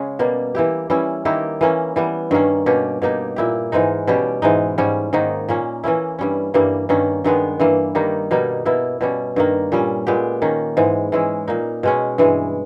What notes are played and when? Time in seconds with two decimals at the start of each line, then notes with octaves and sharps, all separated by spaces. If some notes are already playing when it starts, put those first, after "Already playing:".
Already playing: C#3 G#3 C#4
0.19 B2 G3 A#3
0.55 E3 A#3 E4 G4
0.90 E3 G3 C#4 E4
1.25 D#3 A#3 E4 G4
1.61 E3 A#3 C#4
1.96 E3 G3 B3
2.31 G2 D#3 A#3 C#4
2.66 B2 A#3 C#4 G4
3.02 B2 A#3 D#4 G4
3.36 A#2 A#3 E4 G4
3.72 G#2 E3 G#3 D#4
4.07 B2 G3 C#4 G4
4.42 G#2 E3 G#3 D#4
4.78 G#2 G3 C#4
5.13 G#2 D#3 A#3 D#4
5.49 A#2 A#3 C#4
5.84 E3 A#3 C#4 E4
6.19 G2 G3 C#4
6.54 G2 E3 G3 A#3
6.89 G2 D#3 A#3 C#4
7.24 G2 D#3 G#3 B3
7.60 G2 E3 A#3
7.95 D#3 G3 A#3 D#4
8.31 B2 G3 A#3 D#4
8.65 B2 A#3 E4
9.01 B2 G3 C#4
9.36 G2 D#3 A#3
9.72 A#2 G3 C#4
10.07 A#2 G#3 B3 G4
10.42 D#3 A#3 C#4
10.77 G#2 E3 G#3
11.12 E3 G#3 C#4 E4
11.47 A#2 A#3 D#4
11.83 B2 G#3 C#4
12.18 G2 E3 G#3